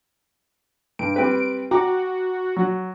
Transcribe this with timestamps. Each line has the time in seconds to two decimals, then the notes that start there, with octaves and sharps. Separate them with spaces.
0.99 G2 D7
1.16 G3 C4 B4
1.71 F#4 G5 A#5 D6
2.56 F#3